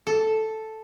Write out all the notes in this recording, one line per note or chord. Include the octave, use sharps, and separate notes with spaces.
A4